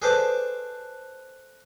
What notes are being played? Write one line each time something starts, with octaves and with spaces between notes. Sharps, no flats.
G#4 A4 B4 C5 D5 A5